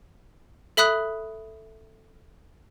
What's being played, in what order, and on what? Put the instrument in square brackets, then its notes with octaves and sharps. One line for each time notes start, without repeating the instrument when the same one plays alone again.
[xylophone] A4 E5 B5 D#6 F#6